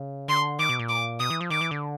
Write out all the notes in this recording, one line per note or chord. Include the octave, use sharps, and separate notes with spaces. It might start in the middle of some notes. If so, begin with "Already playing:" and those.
Already playing: C#3
D3 C6
D#3 D6
B2
A#2
D6
B2 D#6
E3
F3
D#3 D6
E3
D3